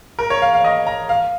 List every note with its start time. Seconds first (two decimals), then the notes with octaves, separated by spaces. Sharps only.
0.19 A#4
0.30 C#5
0.42 F5
0.53 F5
0.65 D#5
0.87 A#5
1.09 F5